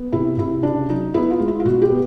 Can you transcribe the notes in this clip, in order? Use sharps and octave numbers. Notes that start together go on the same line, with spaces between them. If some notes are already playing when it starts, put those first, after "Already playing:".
Already playing: B3
C3 E4
C3 E4
C#3 D4
F#3 D#4
B3 E4
F4
G#3
E4
F4
B2 F#4
G4
B3